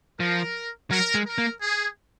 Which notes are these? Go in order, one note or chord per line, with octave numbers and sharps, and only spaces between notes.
F3 A#4
F#3 A#4
G#3
A#4
A#3
G#4